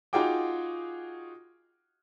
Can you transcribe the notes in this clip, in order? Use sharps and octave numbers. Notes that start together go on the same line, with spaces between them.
D#4 F4 F#4 G#4 G5 D6